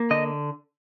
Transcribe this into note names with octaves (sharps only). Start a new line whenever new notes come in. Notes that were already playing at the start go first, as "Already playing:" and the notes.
Already playing: A#3
D3 D#5